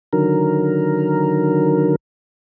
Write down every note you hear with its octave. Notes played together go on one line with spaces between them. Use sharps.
D3 D#3 F#3 A#4